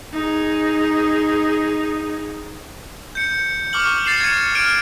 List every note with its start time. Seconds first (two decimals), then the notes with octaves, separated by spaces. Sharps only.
0.13 D#4 G#4
3.15 G6 C#7
3.73 C#6 D6 F6 F#7
4.05 A6 C7 E7 F#7
4.21 G#6 C#7 D#7
4.55 F6 D7 D#7